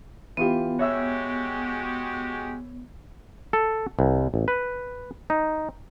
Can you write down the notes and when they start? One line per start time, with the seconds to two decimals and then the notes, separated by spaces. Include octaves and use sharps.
0.37 E3 B3 F4 G4
0.79 G#3 F#4 G4 C#5 E5 E6
3.53 A4
3.99 C2
4.34 A1
4.48 B4
5.30 D#4